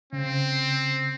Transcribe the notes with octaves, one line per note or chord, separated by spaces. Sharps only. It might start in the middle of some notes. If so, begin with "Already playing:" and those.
C#3 C4